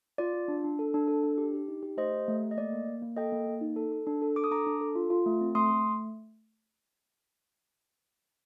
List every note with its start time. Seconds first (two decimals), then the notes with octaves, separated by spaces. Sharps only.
0.18 F4 D5
0.33 F4
0.48 D4
0.64 D4
0.79 A4
0.94 D4
1.08 A4
1.24 D4
1.38 G4
1.54 G4
1.68 D#4
1.83 G4
1.97 A3 C5 D#5
2.13 G4
2.28 A3
2.43 A3
2.51 D#5
2.57 A#3 D5
2.72 A#3
2.88 A#3
3.02 A#3
3.16 A4 D#5 G5
3.32 A#3
3.46 A#3
3.61 D#4
3.76 A4
3.92 A4
4.07 D4
4.22 A4
4.36 A4 D6
4.44 D#6
4.51 D4 A#5 D6
4.67 D4
4.81 A4
4.95 F4
5.10 F4
5.26 A3
5.41 C4
5.55 A3 C6 D#6
5.71 A3